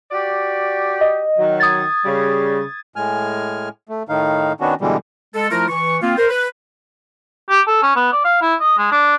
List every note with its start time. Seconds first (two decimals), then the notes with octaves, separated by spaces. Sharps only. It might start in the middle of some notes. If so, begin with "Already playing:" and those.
0.11 F#4 G4 D5
1.01 D#5
1.38 D#3 F#3
1.60 D#6 G#6 A6
2.05 C#3 G3
2.96 A2 G#3 G#5 F6
3.89 A3
4.09 A2 D#3 D#4 F5
4.60 D#3 B3 C#4 D4 F#4
4.81 B2 D3 E3 G3 G#3
5.34 G#3 A4
5.51 F3 A3 E4 F4 A#4
5.69 E3 C#6
6.02 A#3 C4 F4
6.17 A#4 C5
6.29 B4
7.50 G4
7.67 A4
7.82 C#4
7.96 B3
8.13 D5
8.24 F5
8.42 E4
8.60 D#5
8.78 G#3
8.92 D4